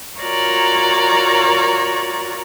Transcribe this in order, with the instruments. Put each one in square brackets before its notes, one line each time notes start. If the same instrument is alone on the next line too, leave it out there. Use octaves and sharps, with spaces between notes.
[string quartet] F4 F#4 A#4 C#5 D5 A#5